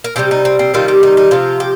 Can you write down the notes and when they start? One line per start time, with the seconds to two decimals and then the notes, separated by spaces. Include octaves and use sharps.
0.04 A#4
0.16 C3 D#3 G3 G4
0.31 D#4
0.45 C4
0.59 C4
0.74 C3 D#3 G3 F4
0.88 G4
1.03 D#4
1.17 D#4
1.31 C3 F3 F4
1.60 G4